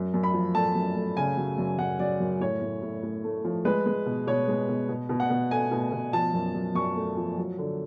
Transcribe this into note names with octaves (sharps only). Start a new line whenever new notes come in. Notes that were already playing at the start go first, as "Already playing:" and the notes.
Already playing: F#2
F#2
B5
F3
A3 A5
F#2
A3
C#3 G#5
F#3
F#2
F#2 F#5
F#3 D5
F#2
A2 C#5
A2
A2
A2
A3
F3
G#3 B4
G#3
B2
B2 C#5
G#3
B2
B2
B2
F#5
B2
A3 G#5
B2
B2
F3 A5
F#2
F#2
F#2 C#6
A3
F3
F#3
D3